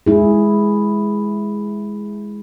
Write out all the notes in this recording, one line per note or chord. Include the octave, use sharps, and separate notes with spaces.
G#3 E4 G#4